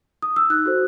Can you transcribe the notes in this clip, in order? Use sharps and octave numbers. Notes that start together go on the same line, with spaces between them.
D#6
E6
D#4 F#6
F#4 A4 C5